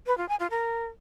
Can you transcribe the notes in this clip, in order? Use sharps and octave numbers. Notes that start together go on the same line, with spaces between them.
B4
F4
G#5
F4
A#4